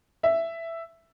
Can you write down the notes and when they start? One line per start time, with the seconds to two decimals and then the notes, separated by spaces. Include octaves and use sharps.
0.23 E5